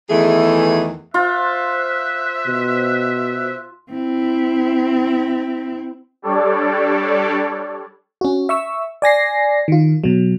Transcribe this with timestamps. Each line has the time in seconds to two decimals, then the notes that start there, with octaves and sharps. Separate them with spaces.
0.10 E2 D#3 E3 A3 G#4
1.14 F4 C5 E5 F#6
2.47 B2
3.91 C4 E4
6.22 G3 D4 A4 C#5 D5
8.21 C#4 F#4
8.49 E5 C#6 E6
9.02 D5 G#5 A#6 C7
9.68 D#3 F4
10.04 B2 F#3